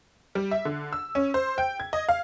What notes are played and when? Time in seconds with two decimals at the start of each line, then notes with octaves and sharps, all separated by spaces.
0.35 G3
0.51 E5
0.65 D3
0.93 E6
1.15 C#4
1.34 C5
1.58 G5
1.80 G#6
1.93 D#5
2.09 F5